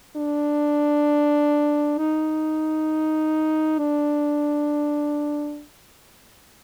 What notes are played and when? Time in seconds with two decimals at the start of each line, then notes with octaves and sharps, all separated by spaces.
0.17 D4
1.98 D#4
3.79 D4